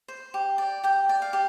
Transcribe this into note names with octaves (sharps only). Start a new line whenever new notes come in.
C5
G4
D5
G4 G5
D5
F5
G4